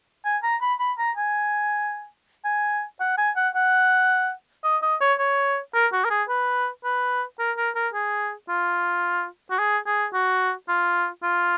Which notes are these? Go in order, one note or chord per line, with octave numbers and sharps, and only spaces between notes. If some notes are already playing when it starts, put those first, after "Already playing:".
G#5
A#5
B5
B5
A#5
G#5
G#5
F#5
G#5
F#5
F#5
D#5
D#5
C#5
C#5
A#4
F#4
A#4
G#4
B4
B4
A#4
A#4
A#4
G#4
F4
F#4
G#4
G#4
F#4
F4
F4